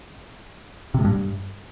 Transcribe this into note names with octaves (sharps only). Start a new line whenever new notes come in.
C3
A2
G2